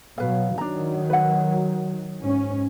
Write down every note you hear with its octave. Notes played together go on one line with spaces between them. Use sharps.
B2 F#3 B4 F5
D#3 F#3 D4 A#5
B4 F#5
G#2 C#4